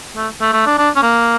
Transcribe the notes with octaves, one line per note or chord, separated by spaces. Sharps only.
A3
A3
A3
D4
D4
C#4
A#3